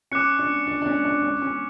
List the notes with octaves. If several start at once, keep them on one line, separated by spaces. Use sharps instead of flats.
C#4 D6 F#6 C#7
D4
D4
D4
C#4
D4
C#4
C#4